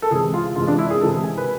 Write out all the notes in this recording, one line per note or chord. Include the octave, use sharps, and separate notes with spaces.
A4
C3 E3 G#3 G#4
F4
C3 E3 G#3 F4
D4
E4
G#4
C3 E3 G#3 A4
G#5
B4